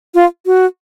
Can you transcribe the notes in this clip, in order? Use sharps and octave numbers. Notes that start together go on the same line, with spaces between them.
F4
F#4